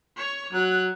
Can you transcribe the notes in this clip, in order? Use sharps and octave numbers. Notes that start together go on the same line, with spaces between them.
C#5 C#6
F#3 F#6